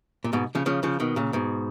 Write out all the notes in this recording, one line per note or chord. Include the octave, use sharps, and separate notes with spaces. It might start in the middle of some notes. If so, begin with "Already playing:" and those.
A#2
G#2 B2
C#3 F3
C#3 F3
C#3 F3
B2 D#3
A#2 C#3
G#2 B2